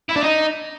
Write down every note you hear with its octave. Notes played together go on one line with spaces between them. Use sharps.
E4
D4
D#4